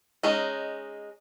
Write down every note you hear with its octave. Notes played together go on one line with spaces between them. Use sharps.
G#3 C#4 D#4